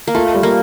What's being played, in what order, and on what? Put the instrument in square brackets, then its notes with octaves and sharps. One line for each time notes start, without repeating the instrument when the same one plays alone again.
[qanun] A#3
[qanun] A3 [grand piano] F4
[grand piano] G3
[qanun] A#3